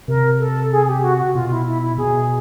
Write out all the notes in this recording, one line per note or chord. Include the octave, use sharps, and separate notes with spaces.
C3 A#4
A4
G#4
G4
F#4
F#4
B2 F4
E4
E4
E4
B2 G#4